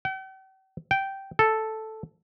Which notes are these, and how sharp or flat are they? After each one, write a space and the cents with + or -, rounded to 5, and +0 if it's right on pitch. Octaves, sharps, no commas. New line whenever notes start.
G5 -45
G5 -10
A4 +0